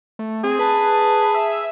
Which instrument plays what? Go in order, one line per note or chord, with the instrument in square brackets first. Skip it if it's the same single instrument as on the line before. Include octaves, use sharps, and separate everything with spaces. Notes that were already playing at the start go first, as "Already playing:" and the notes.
[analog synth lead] A3
[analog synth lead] C4 [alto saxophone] G#4
[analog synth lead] B4 [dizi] A5
[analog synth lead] E5